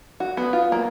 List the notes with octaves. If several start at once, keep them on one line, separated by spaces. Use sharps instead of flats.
F#4
B3
F4
A#3